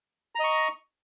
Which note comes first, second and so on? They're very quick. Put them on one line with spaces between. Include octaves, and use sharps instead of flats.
A#5 D#5 C#6